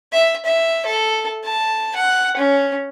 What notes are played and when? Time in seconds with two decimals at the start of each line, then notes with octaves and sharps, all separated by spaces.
0.13 E5
0.45 E5
0.86 A4
1.44 A5
1.95 F#5
2.37 C#4